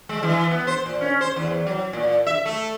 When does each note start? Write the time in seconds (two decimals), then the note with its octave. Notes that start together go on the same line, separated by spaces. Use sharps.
0.09 G#3
0.23 E3
0.51 B3
0.67 C5
0.86 A#2
1.01 C#4
1.21 C5
1.36 E2
1.67 F#3
1.93 A#2
2.27 E5
2.46 A3